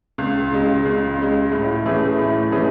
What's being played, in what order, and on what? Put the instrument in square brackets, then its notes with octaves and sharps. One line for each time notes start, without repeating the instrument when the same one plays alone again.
[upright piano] C#2
C#3 G#3
C#2
C#3 G#3
A2
E3 A3 C#4 G#4
A2
E3 A3 C#4 G#4